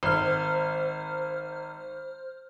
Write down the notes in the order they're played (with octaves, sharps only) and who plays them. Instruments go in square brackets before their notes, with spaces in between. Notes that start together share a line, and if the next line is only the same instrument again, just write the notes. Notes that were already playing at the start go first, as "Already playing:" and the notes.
[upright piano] G#1 [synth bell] C5 F6